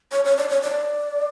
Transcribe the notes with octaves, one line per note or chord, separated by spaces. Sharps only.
C#5
C#5
D5
C#5
D5